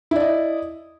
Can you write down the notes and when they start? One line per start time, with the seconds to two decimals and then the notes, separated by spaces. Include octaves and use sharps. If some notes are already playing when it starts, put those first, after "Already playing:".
0.11 E4
0.16 D5
0.20 D#5